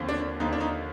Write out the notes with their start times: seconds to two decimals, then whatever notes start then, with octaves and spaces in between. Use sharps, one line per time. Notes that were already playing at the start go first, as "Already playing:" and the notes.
Already playing: D#2 D3 F3 C4
0.09 D4
0.40 D#2 D3 F3 D#4
0.53 D4
0.60 D#4